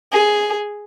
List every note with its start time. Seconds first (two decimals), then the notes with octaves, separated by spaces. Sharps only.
0.12 G#4